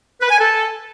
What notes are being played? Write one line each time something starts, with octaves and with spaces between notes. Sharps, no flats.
B4
G#5
A4